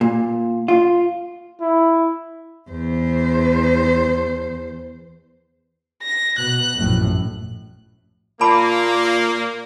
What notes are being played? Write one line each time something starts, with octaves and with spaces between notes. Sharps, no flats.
A#2
F4
E4
E2 C5
A#6
B2 F#6
A#1 F#2 A2
A#2 A#3 A5 B5 D6